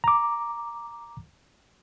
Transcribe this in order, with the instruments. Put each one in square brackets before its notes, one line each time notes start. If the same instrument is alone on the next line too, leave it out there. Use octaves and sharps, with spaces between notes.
[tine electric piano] A#5 D6